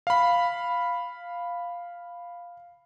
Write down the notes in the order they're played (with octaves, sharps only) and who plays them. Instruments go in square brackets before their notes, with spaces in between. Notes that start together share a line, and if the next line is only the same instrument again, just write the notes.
[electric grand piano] F5 B5